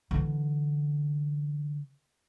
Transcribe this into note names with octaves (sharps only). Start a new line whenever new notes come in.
D3 E3